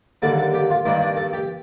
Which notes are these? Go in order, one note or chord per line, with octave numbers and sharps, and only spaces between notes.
D#2 D3 G3 A#3 A4
A4
G4
F4
G2 D#3 G3 A#3 D4
D4
A4
G4